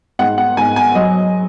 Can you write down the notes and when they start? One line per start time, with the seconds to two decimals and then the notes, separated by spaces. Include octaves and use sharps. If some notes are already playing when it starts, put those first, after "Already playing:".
0.19 G#2 F#5
0.38 F#5
0.57 G#2 G#5
0.76 G#5
0.95 F#3 D#5